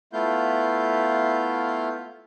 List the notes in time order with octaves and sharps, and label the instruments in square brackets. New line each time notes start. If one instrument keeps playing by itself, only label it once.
[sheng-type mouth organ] A3 B3 E4 F4 F5 G6